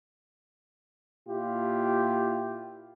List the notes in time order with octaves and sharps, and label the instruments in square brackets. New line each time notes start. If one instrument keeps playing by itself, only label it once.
[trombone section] A#2 E4 F4 G4